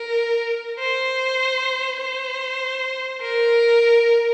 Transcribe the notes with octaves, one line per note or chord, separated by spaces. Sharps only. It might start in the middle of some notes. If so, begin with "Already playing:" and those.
Already playing: A#4
C5
C5
A#4